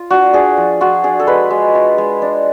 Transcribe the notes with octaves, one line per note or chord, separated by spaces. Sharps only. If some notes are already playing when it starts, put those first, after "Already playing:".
Already playing: F4
D4 F#4
D4 G#4
F3
F4 F#4
D4 G#4
A4
G#3 B4
G#3
F4
G#3
D4